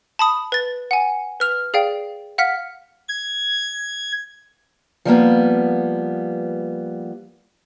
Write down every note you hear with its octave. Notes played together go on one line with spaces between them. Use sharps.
A5 B5 D#6
B4 A6
F#5 G#5
B4 F6 F7
G#4 D5 F5 G5
F5 F#5 F6 B6
G#6
F3 G3 A#3 B3